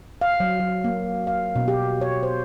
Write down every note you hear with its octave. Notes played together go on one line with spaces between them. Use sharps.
F5
F#3
F#3
A#3
F5
B2
G4
C#5
C5